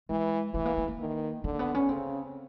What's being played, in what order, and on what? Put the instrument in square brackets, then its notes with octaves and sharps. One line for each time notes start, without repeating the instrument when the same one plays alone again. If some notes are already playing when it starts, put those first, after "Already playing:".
[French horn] E3 [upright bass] G#3
[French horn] E3 [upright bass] A3
[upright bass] A#3
A#3
A#3
[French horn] D#3
[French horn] D3 [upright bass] A#3
[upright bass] B3
C#4
[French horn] C#3 [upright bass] C4